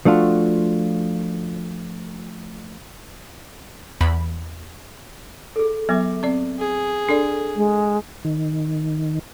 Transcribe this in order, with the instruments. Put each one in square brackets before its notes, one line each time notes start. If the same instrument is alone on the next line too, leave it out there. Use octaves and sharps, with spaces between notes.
[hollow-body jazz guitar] F3 A3 D4 F4 F#4
[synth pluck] E2 B5
[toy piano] G#4 A4
[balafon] F#3 B3 [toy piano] E5 D6
[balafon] C4 D5
[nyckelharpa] G#4
[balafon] D4 D5 [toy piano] A4
[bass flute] G#3
[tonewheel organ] D#3